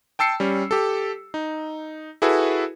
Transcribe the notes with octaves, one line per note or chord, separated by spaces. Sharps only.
G5 A5 E6 C7 C#7
G3 C#4
G4 A4
D#4
E4 F#4 G#4 A4 B4